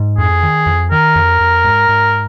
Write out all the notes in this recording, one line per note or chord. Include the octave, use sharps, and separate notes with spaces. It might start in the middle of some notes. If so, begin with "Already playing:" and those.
Already playing: G#2
F2 G#4
D#3
F2
D#3 A#4
F2
F2
G#2
G#2